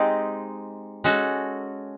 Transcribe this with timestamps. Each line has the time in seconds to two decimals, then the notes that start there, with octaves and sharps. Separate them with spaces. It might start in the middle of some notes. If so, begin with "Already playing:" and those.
Already playing: G#3 C4 D#4 G4
1.04 G#3 C#4 F#4 A4